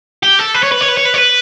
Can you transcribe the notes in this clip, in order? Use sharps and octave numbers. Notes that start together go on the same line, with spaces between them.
G4
A4
B4
C#5
B4
C#5
B4
C#5
B4
C#5
B4